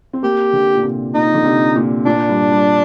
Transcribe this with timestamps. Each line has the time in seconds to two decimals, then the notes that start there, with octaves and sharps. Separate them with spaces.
0.13 C4
0.23 A#3 G4
0.53 D3
0.75 A#2
0.83 C3
1.14 A#2 D#4
1.34 D3
1.44 C3
1.76 A#2
2.05 A#2 D4
2.29 G2
2.52 G2